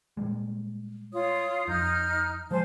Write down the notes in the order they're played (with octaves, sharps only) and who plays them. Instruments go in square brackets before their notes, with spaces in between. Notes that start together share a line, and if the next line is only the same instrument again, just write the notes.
[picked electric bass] A#2 G3 G#3
[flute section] F4 C#5 D#6
[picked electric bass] F2 [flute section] D#4 F6 G6
[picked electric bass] F3 G#3 [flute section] C5 G#5 A5